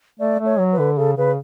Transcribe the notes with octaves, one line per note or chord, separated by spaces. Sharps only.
A3 D5
A3
C#5
F#3
B4
D3
C#3 A4
C#3 B4